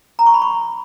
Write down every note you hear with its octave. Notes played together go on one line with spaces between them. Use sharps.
A#5
C#6
B5
C#6